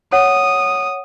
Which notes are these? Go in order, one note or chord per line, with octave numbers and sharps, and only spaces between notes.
C#5 F#5 D#6